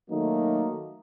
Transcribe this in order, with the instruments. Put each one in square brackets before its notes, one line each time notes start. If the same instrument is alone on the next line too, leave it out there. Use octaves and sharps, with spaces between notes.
[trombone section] D#3 F#3 A3 A#3 D#4